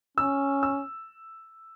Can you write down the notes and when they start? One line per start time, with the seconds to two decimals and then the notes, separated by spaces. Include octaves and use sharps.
0.17 C#4 E6
0.63 E6